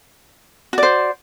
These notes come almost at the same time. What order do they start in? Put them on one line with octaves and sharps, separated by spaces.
F#4 D5 C5